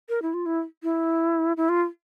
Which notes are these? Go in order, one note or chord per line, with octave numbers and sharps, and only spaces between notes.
A#4
E4
F4
E4
E4
E4
F4